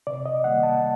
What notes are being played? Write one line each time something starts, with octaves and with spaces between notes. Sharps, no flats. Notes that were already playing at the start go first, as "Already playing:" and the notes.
C3 D5
D#5
D#3 G3 A#3 F#5
A5